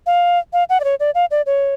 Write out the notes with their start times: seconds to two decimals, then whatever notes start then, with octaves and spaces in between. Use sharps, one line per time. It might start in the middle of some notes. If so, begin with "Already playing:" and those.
0.06 F5
0.53 F5
0.69 F#5
0.80 D5
0.84 C#5
1.00 D5
1.15 F5
1.31 D5
1.46 C#5